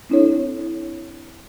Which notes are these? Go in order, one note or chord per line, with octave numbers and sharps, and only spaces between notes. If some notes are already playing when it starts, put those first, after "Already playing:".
C4 D4 E4 A4 C#5